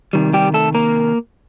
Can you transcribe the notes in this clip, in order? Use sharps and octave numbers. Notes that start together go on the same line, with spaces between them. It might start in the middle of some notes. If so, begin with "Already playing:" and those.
C3 D#3 G3
G3 G4
A3 A4
A#3 A#4